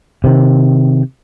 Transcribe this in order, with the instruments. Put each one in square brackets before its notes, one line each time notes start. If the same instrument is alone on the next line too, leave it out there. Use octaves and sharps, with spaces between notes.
[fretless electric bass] C3 D#3